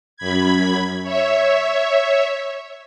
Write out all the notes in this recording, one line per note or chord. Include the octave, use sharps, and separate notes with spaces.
F#2 B5 G#6
C#5 E5